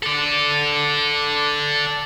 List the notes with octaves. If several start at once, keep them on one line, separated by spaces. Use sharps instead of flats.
A4 D5